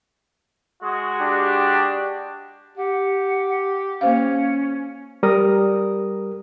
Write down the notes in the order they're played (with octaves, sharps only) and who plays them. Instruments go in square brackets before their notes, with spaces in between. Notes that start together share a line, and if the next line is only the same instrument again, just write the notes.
[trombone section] G#3 F#4
[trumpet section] D4 G4
[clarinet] G4 [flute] F#5
[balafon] A#3 C5 F5 [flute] C#4
[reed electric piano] G3 A#4 D#6